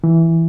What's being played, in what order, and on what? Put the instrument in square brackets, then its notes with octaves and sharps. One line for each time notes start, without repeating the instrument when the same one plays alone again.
[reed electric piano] E3